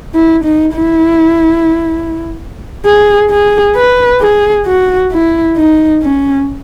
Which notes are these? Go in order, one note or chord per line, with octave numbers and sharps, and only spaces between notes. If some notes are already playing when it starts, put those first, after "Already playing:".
E4
D#4
E4
G#4
G#4
B4
G#4
F#4
E4
D#4
C#4